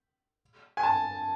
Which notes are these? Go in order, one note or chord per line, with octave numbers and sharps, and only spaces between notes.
G#5
A5